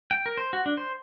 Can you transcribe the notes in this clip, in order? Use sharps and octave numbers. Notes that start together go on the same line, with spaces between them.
G5
A#4
C5
F#4
D4
C5